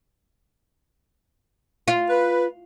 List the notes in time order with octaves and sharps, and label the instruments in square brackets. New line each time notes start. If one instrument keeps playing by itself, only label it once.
[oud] F4
[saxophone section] B4